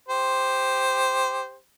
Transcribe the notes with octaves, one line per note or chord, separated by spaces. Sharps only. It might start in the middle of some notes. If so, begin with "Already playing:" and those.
G4 C5